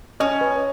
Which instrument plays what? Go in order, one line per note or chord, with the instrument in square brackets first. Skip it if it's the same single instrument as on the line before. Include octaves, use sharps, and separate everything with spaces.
[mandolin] C#4 [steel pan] D#5
[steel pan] B4